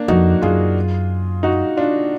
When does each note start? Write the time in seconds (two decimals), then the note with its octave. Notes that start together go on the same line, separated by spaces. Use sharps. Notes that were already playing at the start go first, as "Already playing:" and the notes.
Already playing: A#3 D4
0.08 F2 D#4 F#4
0.42 F#2 F4 G#4
1.43 D#4 F#4
1.77 D4 F4